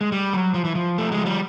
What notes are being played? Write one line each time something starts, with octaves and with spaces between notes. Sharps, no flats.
G#3
G3
F#3
F3
E3
F3
A3
G#3
G3